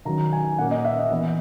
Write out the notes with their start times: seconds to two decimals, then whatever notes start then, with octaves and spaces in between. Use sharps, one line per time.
0.05 D#3 F#3 C#4 A#5
0.33 G#5
0.58 A#2 A#3 C#4 F#5
0.71 D#5
0.85 E5
0.98 D#5
1.11 E3 B3 D#5